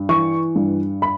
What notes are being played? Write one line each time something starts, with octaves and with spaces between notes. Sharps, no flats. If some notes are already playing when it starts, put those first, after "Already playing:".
Already playing: G2
E3 C#6
G2
B5